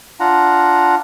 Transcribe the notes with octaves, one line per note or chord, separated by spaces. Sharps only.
D4 F4 F#5 A#5